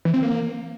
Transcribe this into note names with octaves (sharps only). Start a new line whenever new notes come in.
E3
C4
A#3